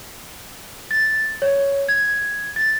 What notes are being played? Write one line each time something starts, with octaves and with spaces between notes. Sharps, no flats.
A6
C#5
G#6
A6